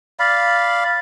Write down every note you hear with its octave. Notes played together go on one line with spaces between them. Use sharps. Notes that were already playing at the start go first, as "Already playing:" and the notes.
D5 F5 B5